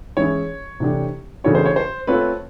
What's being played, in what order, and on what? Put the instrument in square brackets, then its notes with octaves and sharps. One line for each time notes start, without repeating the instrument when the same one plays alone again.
[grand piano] E3 G#3 C#4 E4 G#4 [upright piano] C#5
[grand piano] C3 E3 A3 D4 G4
[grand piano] C#3 E3 A3 D4 F#4 [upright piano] C#5
[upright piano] C5
C#5
C5
[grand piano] A3 C4 F4 A4 C#5 [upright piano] B4